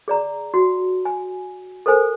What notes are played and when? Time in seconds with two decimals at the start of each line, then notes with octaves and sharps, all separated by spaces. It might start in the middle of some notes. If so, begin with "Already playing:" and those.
0.08 G#4 D5 A#5
0.54 F#4
1.05 G#5
1.86 A4 A#4 C5 G#5